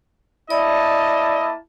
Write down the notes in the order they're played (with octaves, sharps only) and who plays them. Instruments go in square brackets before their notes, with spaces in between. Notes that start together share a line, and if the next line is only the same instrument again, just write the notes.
[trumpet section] A#3 D#5 A5 [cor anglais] E4 [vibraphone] D5